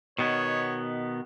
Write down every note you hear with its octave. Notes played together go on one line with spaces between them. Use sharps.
B2 D#3 B3 C#5